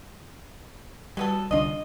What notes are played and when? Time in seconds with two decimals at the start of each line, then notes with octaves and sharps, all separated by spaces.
1.17 F#3 G3 B3 A4
1.51 C2 D3 D4 F4 D#5